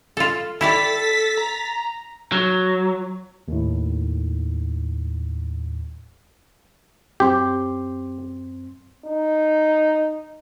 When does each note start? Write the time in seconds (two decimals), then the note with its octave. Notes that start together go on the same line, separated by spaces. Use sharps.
0.17 F4 A4
0.61 E4 G4 A4 D5 A6 B6
1.37 A#5
2.32 F#3
3.48 D#2 A2
7.20 F#2 C4 G4 C6
9.06 D#4